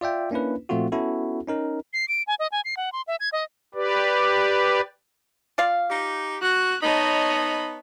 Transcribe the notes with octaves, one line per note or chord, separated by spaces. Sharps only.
F4 D5 E5 G5
A#3 C#4 D4 E4 B4
A#2 F3 A3 C4 F4 F#4
B3 C#4 E4 F#4 A4
C#4 D#4 A#4
C7
D7
G#5
D#5
G#5
C7
F#5
C6
E5
G#6
D#5
G4 B4 D5
F4 D5 F5
D#4 G4
F#4 F#6
B3 D#4 C#5 D#5 A5 B5